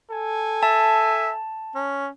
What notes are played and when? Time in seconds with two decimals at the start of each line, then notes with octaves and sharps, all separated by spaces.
0.11 A4 G#5
0.63 E5 A5
1.75 C#4